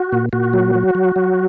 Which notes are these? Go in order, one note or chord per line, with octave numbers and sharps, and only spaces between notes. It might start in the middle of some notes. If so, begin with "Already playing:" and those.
Already playing: F#4
A#2
A#2 F#4
F#3
F#3
F#3
F#3